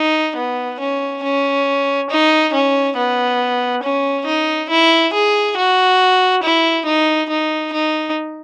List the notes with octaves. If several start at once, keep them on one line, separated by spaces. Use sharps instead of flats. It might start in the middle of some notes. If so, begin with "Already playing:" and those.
Already playing: D#4
B3
C#4
C#4
D#4
C#4
B3
C#4
D#4
E4
G#4
F#4
E4
D#4
D#4
D#4